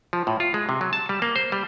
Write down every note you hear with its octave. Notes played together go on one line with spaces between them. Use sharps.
F3
A2
F4
G#3
C3
F#3
A5
G3
A#3
C5
G3